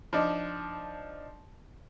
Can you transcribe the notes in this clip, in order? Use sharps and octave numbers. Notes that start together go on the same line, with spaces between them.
F3 D4 D#4